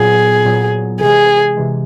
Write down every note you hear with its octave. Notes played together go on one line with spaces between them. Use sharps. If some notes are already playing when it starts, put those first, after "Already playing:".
Already playing: A#2 F#3 B3 G#4
A#2 F#3 B3
C3 E3 G#3 G#4
C3 E3 G#3